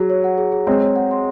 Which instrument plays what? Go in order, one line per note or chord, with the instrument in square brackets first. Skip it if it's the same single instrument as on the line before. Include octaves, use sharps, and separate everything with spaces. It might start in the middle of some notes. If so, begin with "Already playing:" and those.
Already playing: [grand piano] F#3 [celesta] F#4 G#4
[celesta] C#5
F#5
G#4
G#4
[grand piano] G#3 C4 [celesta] C#5
[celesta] C#5
F#5
C6